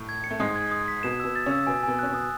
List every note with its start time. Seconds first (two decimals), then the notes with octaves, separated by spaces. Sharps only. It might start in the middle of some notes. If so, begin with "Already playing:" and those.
Already playing: A2 A3
0.09 G#6
0.24 C#7
0.31 A3
0.40 G#2 G#3 D#6
0.56 G#6
0.71 D#6
0.88 B6
1.03 B2 B3 E7
1.20 B2 B3 E6
1.36 A6
1.46 C#3 C#4 E6
1.67 B2 B3 G#5
1.83 B2 B3 G#5
1.99 C#4 F#6
2.09 B2 B3 D#6